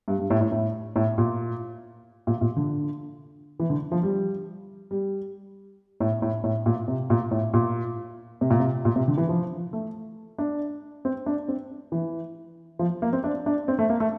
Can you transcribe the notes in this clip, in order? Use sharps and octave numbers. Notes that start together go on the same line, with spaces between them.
G2
G2
A2
A2
A2
A2
A#2
A#2
A#2
D3
E3
D3
F3
G3
G3
A2
A2
A2
A#2
C3
A#2
A2
A#2
C3
A#2
C3
A#2
C3
D3
E3
F3
A3
D4
C4
D4
C4
E3
F3
A#3
C4
D4
D4
C4
A3
A#3
A3